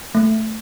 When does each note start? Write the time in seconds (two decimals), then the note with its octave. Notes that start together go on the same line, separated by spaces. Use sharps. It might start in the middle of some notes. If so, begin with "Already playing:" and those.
0.15 A3